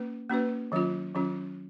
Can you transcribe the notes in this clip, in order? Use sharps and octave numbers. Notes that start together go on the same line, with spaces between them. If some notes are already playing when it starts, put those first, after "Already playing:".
Already playing: A#3 C#4 B4
A#3 C#4 F#4 B4
D#3 F#3 C#4 F4
D#3 F#3 C#4 F4